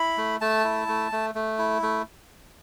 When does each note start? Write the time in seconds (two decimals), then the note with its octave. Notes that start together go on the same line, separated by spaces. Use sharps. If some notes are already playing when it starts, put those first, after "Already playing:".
Already playing: E4 B5
0.18 A3
0.41 A3 A5
0.64 E4
0.88 A3
1.12 A3
1.35 A3
1.59 E4
1.82 A3